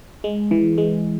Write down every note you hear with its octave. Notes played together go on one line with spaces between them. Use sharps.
G#3
E3
G#3